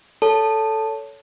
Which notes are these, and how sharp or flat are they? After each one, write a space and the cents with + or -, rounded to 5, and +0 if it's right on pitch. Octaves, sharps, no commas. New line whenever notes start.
A4 +0 C#5 +20 A5 +0